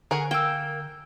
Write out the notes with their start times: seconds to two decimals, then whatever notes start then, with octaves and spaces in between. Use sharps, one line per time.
0.11 D3 G#4 A#4 F#5 G#5 C#6
0.31 A#3 G5 E6